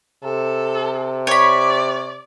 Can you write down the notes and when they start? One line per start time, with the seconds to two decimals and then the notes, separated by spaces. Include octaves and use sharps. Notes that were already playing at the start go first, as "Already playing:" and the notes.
0.24 C3 A4
1.27 C#5 D5 B5